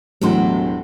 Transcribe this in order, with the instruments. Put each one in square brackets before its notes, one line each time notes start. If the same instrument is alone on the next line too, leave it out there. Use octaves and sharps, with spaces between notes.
[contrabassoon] E1 [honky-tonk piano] E2 A2 C6 [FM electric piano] F#3 [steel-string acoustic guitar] F#4 G4 A4